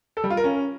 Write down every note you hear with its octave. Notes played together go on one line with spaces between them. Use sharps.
A4
G3
F4
A#4
C#4